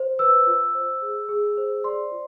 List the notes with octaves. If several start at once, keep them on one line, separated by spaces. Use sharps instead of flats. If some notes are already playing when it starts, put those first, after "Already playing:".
Already playing: C5
B4 E6
F4
C5
G#4
G#4
C5
D5 C6
F4